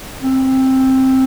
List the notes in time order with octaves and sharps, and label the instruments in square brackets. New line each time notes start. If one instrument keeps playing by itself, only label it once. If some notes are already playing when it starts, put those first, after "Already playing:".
[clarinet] C4